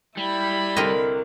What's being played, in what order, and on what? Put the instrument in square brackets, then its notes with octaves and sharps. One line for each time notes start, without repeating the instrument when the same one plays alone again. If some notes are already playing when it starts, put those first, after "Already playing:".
[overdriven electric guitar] G3 [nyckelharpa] E4 B5
[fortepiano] C2 D3 C4 [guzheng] A#4 D#5